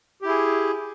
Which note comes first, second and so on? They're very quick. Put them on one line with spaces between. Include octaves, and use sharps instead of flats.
G4 E4 G#4